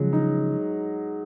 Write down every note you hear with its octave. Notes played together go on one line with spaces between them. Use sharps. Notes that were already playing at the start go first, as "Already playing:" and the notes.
Already playing: C#3 F3 F#3 G#3
D#4